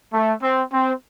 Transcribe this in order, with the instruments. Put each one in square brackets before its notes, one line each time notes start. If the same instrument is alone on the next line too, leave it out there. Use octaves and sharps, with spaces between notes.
[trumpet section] A3
C4
C4